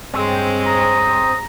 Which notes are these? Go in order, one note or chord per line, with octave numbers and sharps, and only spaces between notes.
G2 G#3 C4 C#5
A#5 D#6